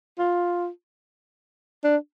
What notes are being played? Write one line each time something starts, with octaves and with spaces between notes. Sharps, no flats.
F4
D4